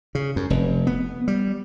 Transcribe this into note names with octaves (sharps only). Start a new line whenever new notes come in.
C#3
F#2
F1
B3
G3